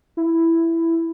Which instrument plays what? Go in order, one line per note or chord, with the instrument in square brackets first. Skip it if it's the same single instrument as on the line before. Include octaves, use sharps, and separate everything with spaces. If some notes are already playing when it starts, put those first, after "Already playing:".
[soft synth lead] E4